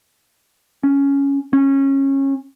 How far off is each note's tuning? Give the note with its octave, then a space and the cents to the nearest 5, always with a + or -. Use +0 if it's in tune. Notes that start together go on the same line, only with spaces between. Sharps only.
C#4 +5
C#4 -20